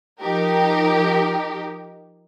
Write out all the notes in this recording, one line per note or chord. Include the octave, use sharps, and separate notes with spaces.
F3 D#4 G4 A#4